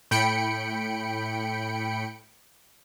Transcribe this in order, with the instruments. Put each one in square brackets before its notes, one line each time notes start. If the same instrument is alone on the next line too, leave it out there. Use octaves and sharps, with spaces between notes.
[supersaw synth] A2 G5 B5 C#7 D7